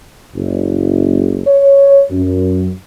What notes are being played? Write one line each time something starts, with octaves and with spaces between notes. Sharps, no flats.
F#1
C#5
F#2